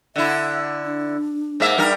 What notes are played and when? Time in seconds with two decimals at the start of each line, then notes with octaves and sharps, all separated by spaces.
0.16 D3 E4 E5
0.84 D4
1.60 G#2 A#3 E5
1.78 G2 G3 D#4 A#4